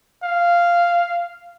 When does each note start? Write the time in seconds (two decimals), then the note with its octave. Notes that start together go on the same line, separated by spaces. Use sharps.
0.24 F5